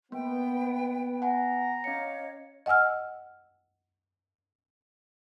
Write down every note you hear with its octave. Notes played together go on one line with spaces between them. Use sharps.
A#3 B3 B4 G5
F#5 G#5 A#5 B5
C#4 C#5 D#5 F5 C#7
D#5 F#5 G#5 E6 F6